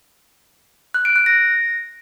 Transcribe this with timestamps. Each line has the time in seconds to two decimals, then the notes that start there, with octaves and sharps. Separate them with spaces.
0.94 F#6
1.05 D7
1.16 F#6
1.26 A#6